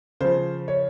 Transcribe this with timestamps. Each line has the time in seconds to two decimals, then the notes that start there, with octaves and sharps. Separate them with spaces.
0.21 C#3 F3 C5
0.68 C#5